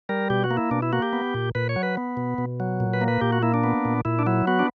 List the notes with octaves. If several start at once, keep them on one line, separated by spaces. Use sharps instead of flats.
G3 A#4
B2 G4
F#4
A#3
E4
B2 D4
E4
A#3 F#4
G4
B3
A#2
A#2 B4
C#5
F#3
B4
B3
B2
B2
F#3
A#2
B4
A#3
B4
A#2 G4
F#4
A#3 E4
D4
B3
A#2
A#2 E4
D4
F#3 E4
B3 F#4
D4